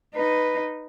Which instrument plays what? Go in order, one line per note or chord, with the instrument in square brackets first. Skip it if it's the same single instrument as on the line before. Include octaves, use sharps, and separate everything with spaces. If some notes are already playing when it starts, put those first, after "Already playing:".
[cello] D#4 B4